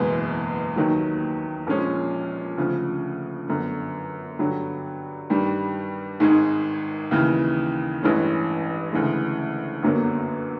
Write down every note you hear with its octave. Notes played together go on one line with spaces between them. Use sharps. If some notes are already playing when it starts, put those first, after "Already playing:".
Already playing: F#1 E2 B2 G#3
D#2 D#3 F#3
A#1 A#2 F3 G#3 C#4
D2 C#3 F3
G1 F#2 D3
G2 D3 F#3
G2 D#3 G3
G#1 G#2 D#3 G#3
D#2 C#3 E3
A1 G2 E3 G#3 C#4
D2 C#3 E3 G#3
G1 F#2 D3 F#3 A#3